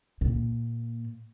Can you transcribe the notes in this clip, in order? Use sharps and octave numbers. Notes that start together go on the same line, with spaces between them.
A#2